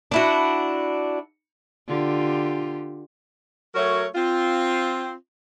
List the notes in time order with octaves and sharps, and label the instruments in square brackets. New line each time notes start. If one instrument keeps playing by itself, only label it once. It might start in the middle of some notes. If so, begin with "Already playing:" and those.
[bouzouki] D4 E4 F#4
[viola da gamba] D3 F4 G4
[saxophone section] F#3 A3 F#4 A#4 C#5
C4 F4